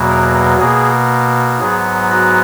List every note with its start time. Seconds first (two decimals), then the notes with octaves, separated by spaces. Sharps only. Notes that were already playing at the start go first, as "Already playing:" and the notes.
Already playing: E2 B2 F#3 A#3
0.09 A#4
0.59 B2 A#3 G#4
1.59 G#2 F#3 B3 G#4
2.10 F#4